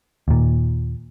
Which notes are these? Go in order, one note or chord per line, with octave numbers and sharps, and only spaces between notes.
D#2 A#2